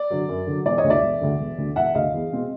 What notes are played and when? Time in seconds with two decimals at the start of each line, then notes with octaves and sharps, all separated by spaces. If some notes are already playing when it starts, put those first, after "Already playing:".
Already playing: D5
0.11 D3 F#3
0.28 F#2
0.47 D3 F#3
0.66 E1 D5
0.78 C#5 D#5
0.84 D2 D3
0.90 D5 E5
1.02 E1
1.21 D2 D3
1.39 E1
1.58 D2 D3
1.76 E1 E5 F#5
1.95 D2 D3 D#5 F5
2.14 E2
2.32 B2 G#3 C4